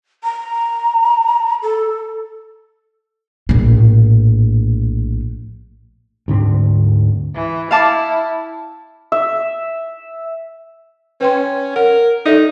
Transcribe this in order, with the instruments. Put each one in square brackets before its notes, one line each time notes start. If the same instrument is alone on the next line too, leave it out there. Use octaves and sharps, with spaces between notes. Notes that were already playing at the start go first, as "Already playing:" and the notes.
[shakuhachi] A#5
A4
[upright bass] A#1 A2
[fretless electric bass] D2 G#2 D3 C4
[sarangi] E3
[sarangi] E4 [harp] F5 A5 D6
[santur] E5
[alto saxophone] C#4 [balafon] B4 G5 C6
[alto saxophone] A#4 [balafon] F#5
[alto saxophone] D#4 [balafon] A4 D5 E5